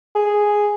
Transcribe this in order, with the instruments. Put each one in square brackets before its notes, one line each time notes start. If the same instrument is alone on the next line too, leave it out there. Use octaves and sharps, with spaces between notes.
[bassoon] G#4